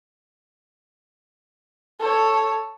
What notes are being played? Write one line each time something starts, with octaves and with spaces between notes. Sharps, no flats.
A4 C#5